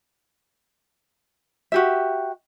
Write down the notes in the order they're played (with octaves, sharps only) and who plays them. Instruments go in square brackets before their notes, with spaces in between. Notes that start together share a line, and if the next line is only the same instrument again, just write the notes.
[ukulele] F#4 G4 E5